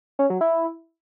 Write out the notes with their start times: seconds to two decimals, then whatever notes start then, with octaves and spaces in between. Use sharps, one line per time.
0.19 C#4
0.30 F#3
0.41 E4